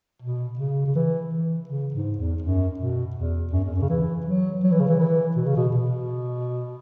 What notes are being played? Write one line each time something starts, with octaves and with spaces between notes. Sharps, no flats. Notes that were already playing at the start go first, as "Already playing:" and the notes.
B2
C#3
C#3
E3
E3
C#3
G#2
E2
F#2
B2
E2
F#2
E2
F#2
C#3
E3
F#3
F#3
E3
C#3
E3
E3
B2
C#3
B2
B2